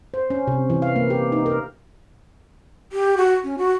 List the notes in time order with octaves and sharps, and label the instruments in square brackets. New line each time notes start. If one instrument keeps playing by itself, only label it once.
[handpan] C5
C#4
C3
E3
F5
A#3
G4
D#4
A#4
[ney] G4
F#4
C#4
F#4